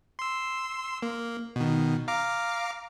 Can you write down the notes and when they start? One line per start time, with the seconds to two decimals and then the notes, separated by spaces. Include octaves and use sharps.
0.19 C6 E6
1.02 A#3
1.56 B2 D#3
2.08 F5 A#5 D6